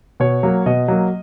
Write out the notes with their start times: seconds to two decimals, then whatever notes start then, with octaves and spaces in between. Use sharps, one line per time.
0.20 B2 C#5
0.43 F#3 A#3
0.66 B2 D#5
0.88 F#3 A#3